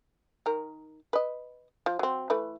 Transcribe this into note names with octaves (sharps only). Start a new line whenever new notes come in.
D#3 A#4
B4 D#5
F3
F#3 C4
E3 A3 B4